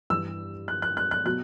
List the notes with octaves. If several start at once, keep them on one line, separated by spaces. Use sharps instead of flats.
G2 E3 G3 E6
F#6
F#6
F#6
F#6
B2 F#3 F#6